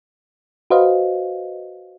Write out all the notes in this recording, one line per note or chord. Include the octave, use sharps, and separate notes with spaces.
F#4 B4 C5 D#5 F5